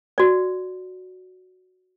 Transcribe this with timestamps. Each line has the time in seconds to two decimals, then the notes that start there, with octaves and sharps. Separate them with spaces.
0.18 F#4 D5